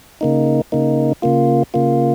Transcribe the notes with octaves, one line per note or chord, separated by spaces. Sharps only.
C#3 A#3 D#4
C#3 A#3 D#4
C#3 A#3 F4
C#3 A#3 F4